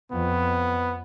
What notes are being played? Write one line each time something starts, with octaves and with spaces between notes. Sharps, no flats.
F2 B3